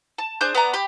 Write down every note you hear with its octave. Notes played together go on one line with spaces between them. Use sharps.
A5
D4 G#4 C5 G6
B3 D5 A#5
G4 B5